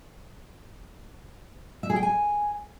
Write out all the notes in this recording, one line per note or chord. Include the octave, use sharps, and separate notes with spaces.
E5
G#4
G5
G#5